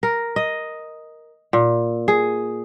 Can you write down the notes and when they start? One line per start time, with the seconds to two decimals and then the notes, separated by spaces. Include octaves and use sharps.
0.03 A#4
0.36 D#5
1.53 A#2
2.08 G#4